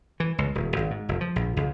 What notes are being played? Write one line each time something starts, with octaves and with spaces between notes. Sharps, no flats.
E3
C#2
D#1
G#1
G#2
F1
F3
A#1
C#2